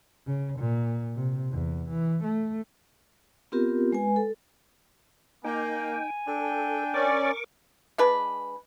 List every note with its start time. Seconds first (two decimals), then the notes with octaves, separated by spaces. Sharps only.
0.27 C#3
0.59 A#2
1.15 C3
1.51 E2
1.90 E3
2.23 A3
3.52 B3 C4 F4 G4 A#4
3.92 G#3 B4 G#5
4.16 A4
5.44 A#3 D#4 G5 G#5
6.28 D4 A4 G5
6.94 C#4 A#4 D5 C#6 D6
7.98 G#3 D4 B4